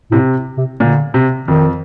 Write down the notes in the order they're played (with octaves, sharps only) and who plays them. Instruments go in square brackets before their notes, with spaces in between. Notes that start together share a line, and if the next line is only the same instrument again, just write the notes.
[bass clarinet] A2 [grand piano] C3
[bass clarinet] C3
[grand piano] A#2 [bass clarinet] D3
[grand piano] C3
[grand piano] F2 [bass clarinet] D#3